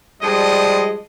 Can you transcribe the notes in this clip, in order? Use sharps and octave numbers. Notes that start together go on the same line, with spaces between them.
F3 G3 G#3 D4 D#5